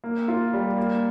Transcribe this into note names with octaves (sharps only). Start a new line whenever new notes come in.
A#3
F4
G3
A#3